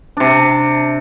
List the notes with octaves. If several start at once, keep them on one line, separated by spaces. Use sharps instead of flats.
C3 D4